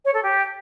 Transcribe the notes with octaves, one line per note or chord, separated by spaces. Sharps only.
C#5
A4
G4